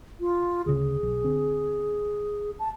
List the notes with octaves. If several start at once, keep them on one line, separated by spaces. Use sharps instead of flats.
F4
D2 C#3 G#4
B1
D3 C4
A5